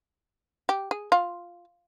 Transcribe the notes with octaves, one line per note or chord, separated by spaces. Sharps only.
G4
G#4
F4